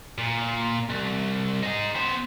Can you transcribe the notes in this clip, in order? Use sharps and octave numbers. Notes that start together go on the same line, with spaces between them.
A#2
C2
D#4 G#4
B3 C5